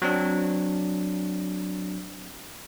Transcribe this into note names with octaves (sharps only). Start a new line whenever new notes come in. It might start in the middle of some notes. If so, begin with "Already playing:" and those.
F#3 C4 D4